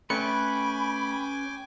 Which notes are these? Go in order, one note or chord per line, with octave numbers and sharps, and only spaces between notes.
A3 C#4 B4 G5 G#5 B5 D6 C#7